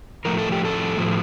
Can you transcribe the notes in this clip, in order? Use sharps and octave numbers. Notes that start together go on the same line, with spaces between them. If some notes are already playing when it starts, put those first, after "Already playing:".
A2 F3 A3 A#4
A4
G4
A4
A2 F3 A3